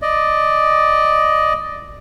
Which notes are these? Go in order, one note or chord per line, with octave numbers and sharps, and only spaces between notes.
D5 D#5